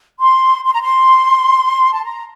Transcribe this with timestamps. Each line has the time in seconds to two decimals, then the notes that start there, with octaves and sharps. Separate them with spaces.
0.19 C6
0.64 C6
0.73 A#5
0.81 C6
1.92 A5
2.04 A#5